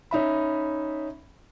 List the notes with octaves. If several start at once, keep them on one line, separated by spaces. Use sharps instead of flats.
C#4 D#4 E5 B5